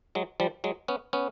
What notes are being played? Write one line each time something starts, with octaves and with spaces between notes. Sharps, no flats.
F#3 G#3
F3 G3
F#3 G#3
B3 C#4
B3 C#4